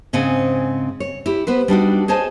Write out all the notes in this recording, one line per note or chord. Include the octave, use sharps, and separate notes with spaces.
G#2 C#3 C4 F#5 G#5
C#5
E4 G4
B3 B4 C5
G3 D4 D#4 F#4
G#4 C5 C#5 D#5 G#5 A5